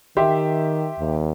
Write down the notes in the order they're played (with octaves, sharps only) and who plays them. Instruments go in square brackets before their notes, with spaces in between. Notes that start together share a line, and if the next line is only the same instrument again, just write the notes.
[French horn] D#3 [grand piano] G4 E5 C6
[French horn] D#2